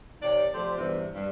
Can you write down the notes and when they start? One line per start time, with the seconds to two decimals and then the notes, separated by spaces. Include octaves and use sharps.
0.21 C3 D#3 C#5 D5
0.52 F3 A3 C4 G4 C5 D5
0.78 E2 G2 C3
1.14 G2